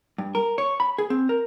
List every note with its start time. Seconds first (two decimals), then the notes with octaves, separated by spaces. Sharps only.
0.18 G2
0.35 A#4
0.58 C#5
0.80 B5
0.98 G#4
1.10 C4
1.29 A#4